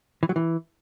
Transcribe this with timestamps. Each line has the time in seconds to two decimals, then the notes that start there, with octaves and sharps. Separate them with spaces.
0.23 E3
0.29 F#3
0.36 E3